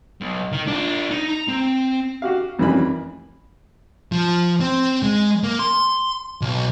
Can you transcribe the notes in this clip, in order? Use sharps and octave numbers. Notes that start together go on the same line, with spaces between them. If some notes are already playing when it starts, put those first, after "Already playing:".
B1
D#3
D4 F4
D#4
A#5
C4
F#4 G4 F5
A1 F2 D#3 E3 G3 B5
F3
C4
G#3
A#3
C6
B1